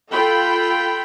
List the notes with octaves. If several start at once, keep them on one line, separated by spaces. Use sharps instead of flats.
F4 A4 G5 B5